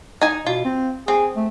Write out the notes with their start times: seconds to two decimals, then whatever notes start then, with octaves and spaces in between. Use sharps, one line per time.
0.22 D#4 G#5
0.47 B2 F4
0.65 C4
1.08 C4 G#4
1.36 A3